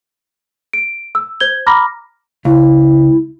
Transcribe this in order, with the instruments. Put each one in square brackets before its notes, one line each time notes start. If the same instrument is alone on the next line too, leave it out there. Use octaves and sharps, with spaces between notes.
[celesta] D7
E6
C5 G6 G#6 G7
A#5 B5 D6 F6 A#6
[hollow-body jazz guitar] C#2 [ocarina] E4